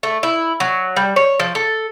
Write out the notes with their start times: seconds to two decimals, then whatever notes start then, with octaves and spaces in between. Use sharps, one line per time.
0.03 A3
0.23 E4
0.60 F#3
0.96 G3
1.16 C#5
1.40 F3
1.55 A4